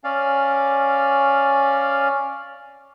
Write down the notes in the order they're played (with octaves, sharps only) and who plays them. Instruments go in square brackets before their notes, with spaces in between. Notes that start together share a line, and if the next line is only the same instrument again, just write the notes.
[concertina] C#4 D5 F5